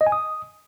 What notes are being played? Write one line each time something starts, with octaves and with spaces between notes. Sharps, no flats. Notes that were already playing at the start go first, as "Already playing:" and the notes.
D#5
G#5
D#6